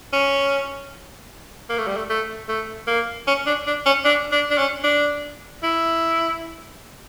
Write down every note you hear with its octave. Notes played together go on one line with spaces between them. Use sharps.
C#4
A#3
A3
G3
A3
A3
A3
A#3
C#4
D4
D4
C#4
D4
D4
D4
C#4
D4
E4